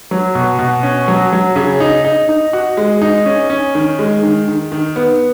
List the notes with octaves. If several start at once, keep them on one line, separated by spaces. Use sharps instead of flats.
F#3
B2
B2
C#4
F#3
F#3
C#3
D#4
D#4
D#4
F#4
G#3
D#4
C#4
C#4
D#3
G#3
D#3
D#3
D#3
B3